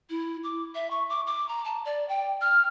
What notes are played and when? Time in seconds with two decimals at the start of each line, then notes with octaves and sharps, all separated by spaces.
0.09 E4
0.43 D6
0.74 E5
0.90 C#6
1.09 D6
1.26 D6
1.48 A#5
1.64 A5
1.85 D5
2.08 G5
2.41 F6